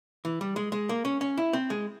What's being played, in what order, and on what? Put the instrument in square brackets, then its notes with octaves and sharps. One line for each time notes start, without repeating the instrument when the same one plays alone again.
[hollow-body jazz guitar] E3
G3
G#3
G#3
A#3
C#4
C#4
E4
C4
G#3